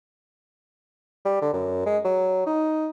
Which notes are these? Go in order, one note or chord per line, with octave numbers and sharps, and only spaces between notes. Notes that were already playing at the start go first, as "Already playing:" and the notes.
G3
D3
F#2
G#3
F#3
D#4